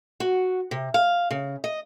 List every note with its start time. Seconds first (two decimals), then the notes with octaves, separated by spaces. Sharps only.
0.20 F#4
0.71 C3
0.94 F5
1.31 C#3
1.64 D#5